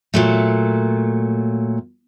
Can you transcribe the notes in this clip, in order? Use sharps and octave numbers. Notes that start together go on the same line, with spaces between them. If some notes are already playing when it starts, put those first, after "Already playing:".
A#2 F#3 A3